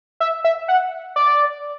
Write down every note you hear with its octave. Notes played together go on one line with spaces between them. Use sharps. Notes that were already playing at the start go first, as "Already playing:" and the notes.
E5
E5
F#5
D5